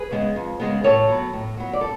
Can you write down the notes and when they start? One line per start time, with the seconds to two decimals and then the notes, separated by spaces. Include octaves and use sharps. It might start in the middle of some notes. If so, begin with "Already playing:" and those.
Already playing: G#4 B4
0.11 C#3 G#3 B3
0.36 F2
0.60 C#3 G#3 B3
0.84 A2 A4 C#5
1.08 F#3 B3
1.33 A2
1.57 F#3 B3
1.73 D5
1.81 A4